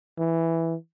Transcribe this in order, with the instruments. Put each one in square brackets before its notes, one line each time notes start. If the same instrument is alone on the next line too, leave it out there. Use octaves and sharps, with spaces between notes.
[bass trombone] E3